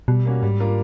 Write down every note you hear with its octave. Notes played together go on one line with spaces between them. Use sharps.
B2 G3
A#3 C#4 F#4
G#2 G3
A#3 D4 F4 A#4